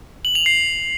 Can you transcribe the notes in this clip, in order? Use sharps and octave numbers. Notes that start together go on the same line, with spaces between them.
F#7
F7
C7